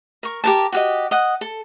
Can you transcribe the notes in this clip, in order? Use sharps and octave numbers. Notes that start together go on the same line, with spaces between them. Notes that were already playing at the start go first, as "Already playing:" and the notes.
A#4 C#6
G4 A#4 A5
F#4 G4 D#5
D#5 F#5
A4